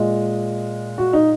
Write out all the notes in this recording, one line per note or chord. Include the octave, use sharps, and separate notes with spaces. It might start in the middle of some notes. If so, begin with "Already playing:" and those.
Already playing: A#2 G#3 D#5
F#4
D#4